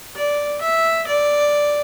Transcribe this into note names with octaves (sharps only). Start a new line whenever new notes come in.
D5
E5
D5